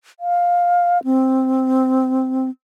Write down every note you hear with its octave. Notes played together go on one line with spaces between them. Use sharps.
F5
C4